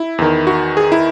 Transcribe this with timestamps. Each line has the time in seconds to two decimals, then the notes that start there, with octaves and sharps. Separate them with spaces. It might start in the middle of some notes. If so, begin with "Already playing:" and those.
Already playing: E4
0.18 E2 D#3
0.47 F#4
0.77 G#4
0.92 E4